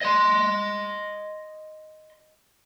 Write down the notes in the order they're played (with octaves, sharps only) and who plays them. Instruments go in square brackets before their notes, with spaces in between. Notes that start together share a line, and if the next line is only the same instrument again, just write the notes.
[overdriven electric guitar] D#5 C6